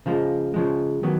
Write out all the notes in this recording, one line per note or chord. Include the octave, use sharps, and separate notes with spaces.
C#3 F3 G#3
C#3 F3 G#3
D#3 F#3 B3